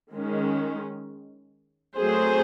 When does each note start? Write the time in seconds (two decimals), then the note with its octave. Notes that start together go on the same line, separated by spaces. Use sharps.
0.13 D#3 G#3 C#4
1.96 F#3 A3 C4 G#4 C5